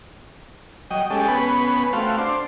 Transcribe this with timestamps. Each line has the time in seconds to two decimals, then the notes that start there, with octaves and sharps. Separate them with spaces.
0.91 F#3 D#5 G5
1.10 G#3 C#4 G4 A4
1.28 B3 C#4 B4
1.93 A3 C4 F#4 F5
2.18 D4 C5